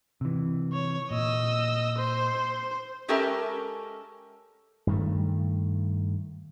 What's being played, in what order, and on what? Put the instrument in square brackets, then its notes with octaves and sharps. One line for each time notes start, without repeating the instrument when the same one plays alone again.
[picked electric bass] C3 E3
[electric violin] C#5
[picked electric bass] A#2 [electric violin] D#5 E6
[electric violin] C5
[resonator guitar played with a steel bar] G#3 C#4 G4 A4 A#4 E5
[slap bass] G2 D#3 A3